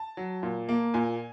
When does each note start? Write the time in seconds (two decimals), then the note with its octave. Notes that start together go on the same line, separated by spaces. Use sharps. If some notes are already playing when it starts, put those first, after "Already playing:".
Already playing: A5
0.17 F#3
0.43 A#2
0.69 A#3
0.94 A#2 G#5